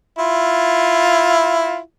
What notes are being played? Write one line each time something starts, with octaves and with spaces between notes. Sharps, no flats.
E4 F4